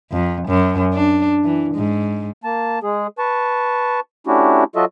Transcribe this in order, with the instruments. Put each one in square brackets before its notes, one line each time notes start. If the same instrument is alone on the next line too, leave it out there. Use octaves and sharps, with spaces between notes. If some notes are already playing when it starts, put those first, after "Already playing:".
[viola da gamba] F2
F#2
D4
E3
G#2
[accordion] A#3 A5
G#3 G#4
B4 A5 C#6
A3 C#4 D4 E4 F#4 G4
F#3 F4 F#4 A4 D#5 E5